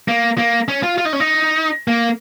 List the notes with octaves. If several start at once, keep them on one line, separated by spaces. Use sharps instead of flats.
A#3
A#3
C#4
F4
F4
D#4
C#4
D#4
A#3